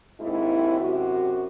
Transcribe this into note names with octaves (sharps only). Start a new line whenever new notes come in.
D#2 G#2 C4 E4
F#2 C3 F#4